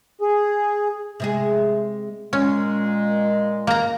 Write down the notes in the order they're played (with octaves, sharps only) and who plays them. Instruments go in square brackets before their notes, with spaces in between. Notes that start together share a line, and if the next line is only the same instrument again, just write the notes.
[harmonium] G#4
[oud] C3 G#3 G#4
[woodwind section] A#2 G#3 [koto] C#4
[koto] A#3 A#5